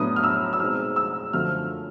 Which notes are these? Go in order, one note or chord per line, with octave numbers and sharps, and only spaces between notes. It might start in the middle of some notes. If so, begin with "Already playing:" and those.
Already playing: A2 F#3 B3 D4 D#6
F6
E6
E6
B2 G#3 C4 D#4 F6
E6
F#2 D3 F3 A3 F6